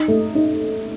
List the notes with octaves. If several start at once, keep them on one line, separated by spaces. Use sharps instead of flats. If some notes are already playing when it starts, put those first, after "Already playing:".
Already playing: D#4
A3
D#4